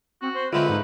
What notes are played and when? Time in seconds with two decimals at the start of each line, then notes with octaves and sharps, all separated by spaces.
0.22 C4 F#4
0.34 C5
0.53 D3 G#3 C4 F4 B4 E5
0.69 G#2 D#4